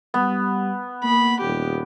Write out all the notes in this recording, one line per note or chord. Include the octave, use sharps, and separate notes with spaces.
G3 B3
A#3 B5
D#1 G4